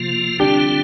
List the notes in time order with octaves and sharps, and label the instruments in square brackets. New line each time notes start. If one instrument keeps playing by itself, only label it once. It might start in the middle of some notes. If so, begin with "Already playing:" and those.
Already playing: [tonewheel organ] C3 F3 A#3 F4
[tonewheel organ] D3 G3 C4 F4 [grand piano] D4 G4